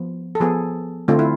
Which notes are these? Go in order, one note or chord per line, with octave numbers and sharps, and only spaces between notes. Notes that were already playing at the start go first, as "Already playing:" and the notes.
Already playing: F3 B3
A4
F3 B3 G#4
D3 A3 C4 F4
E4